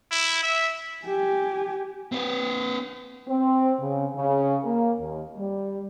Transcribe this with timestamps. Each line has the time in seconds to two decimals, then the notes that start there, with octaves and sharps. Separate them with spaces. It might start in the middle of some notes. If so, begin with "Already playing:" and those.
0.11 E4
0.43 E5
1.06 G4 G#5
2.12 C4 B4
3.28 C4
3.80 C#3
4.15 C#3
4.64 A#3
5.00 D#2
5.37 G3